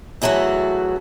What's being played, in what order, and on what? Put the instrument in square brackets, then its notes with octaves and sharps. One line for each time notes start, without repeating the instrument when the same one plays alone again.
[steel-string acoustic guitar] E2 E3 F#3 A3 F#4 A4